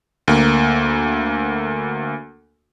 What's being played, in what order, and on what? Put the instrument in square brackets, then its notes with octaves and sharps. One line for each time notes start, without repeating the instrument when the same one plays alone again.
[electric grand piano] D2 A#3